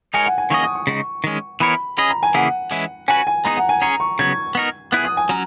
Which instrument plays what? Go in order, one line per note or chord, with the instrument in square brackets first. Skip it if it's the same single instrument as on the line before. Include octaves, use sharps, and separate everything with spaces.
[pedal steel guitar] G#3 D#4 A#4 C#5 [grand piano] G#5
[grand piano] F#5
G#5
[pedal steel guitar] D#3 A#3 C#4 G#4 D#5 [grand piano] C#6
[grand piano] D#6
C#6
[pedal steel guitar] C#3 G#3 D#4
D#3 G#3 C#4
[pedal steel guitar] E3 B3 E4 A#4 C#5 [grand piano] B5
[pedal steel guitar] C#4 G#4 D#5 [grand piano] B5
[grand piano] A#5
G#5
[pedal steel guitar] C#3 E3 A#3 E4 G#4 [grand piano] F#5
[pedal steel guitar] E3 G#3 C#4 E4
[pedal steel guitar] C#4 F#4 B4 [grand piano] G#5
[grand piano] G#5
[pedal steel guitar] G#3 B3 D#4 G#4 [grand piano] A#5
[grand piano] F#5
G#5
[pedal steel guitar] C#4 G#4 C#5 [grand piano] A#5
[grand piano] C#6
[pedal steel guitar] C#3 F#3 B3 [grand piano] G#6
[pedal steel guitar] B3 D#4 A#4
[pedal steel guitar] B3 E4 G#4 [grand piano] F#6
[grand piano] D#6
G#5
[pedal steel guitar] F#3 C#4 [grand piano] A#5